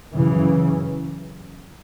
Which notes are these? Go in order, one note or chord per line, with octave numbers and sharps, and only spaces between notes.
F#2 C#3 E3